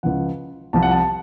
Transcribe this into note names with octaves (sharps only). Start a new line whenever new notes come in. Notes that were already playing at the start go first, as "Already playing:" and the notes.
C#2 C#3 F3 F#5
C2 C3 F3 A5
F#5
A5